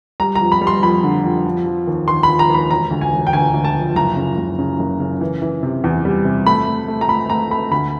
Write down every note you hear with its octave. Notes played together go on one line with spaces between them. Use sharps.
G3 A#5
A#5
F2
B5
G3
C6
F2 B5
D3
F2
F3
F3
D#2
D#2 C6
B5
F3
A#5
D#2
B5
E1 A#5
D2
G#5
E1
G5
D2 G#5
D2
A5
F3
F#1 A#5
C#3
F#1
C#3
F#1
C#3
E3
E3
C3
E2
G3
C3
A3 B5
A3
A3
A#5
A3 B5
A3 A#5
A3 B5
D2 B5